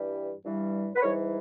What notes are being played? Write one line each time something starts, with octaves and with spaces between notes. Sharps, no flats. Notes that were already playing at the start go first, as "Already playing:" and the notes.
Already playing: G2 E3 G3
G2 E3 G3
B4
G#2 E3 G3 A#4 C#5